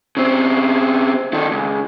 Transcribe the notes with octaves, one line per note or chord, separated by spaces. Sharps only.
C#3 C4
D#3 A4
C#2